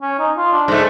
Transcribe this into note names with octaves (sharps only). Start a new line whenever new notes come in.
C#4
D#4
F4
D4
G#2 A3